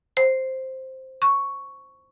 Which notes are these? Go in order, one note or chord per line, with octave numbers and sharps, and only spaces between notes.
C5
C#6